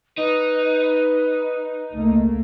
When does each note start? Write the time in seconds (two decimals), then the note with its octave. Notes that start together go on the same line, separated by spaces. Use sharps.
0.18 D#4 B4
1.95 C#2 A3 A#3